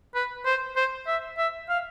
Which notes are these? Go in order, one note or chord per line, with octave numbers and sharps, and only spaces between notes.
B4
C5
C5
E5
E5
F5